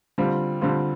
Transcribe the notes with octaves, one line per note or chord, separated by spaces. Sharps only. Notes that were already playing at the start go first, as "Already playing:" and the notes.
D3 G3 C4 F4
D3 G3 C4 F4